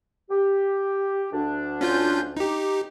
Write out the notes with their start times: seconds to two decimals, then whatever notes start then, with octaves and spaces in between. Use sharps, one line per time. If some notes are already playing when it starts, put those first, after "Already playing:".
0.30 G4
1.32 D2 D4
1.81 C#4 F4 G6
2.37 D#4 G4